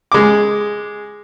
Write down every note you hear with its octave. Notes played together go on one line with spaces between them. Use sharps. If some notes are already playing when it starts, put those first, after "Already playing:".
G#3 D6